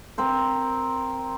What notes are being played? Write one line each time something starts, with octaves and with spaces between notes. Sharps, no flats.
C4 A#4 C5